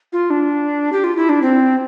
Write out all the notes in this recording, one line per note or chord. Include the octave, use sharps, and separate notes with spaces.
F4
D4
G4
F4
E4
D4
C4